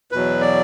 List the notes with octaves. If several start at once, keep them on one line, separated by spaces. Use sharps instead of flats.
E2 B2 F#3 B4
D5